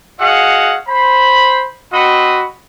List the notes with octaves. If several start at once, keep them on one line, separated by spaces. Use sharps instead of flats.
F#4 G#4 D#5 F5 F#5
C5 B5
C4 F#4 D#5 B5